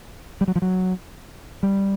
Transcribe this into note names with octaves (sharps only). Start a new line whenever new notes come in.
G3
F#3
F3
F#3
G3